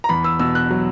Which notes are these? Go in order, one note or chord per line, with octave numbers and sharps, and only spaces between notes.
A#5
E2 B5
E6
B2 E6
F#6
F#3